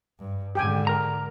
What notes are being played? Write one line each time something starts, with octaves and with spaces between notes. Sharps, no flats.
G2
G#2 D3 G4 G5 G#5
A#4 A#5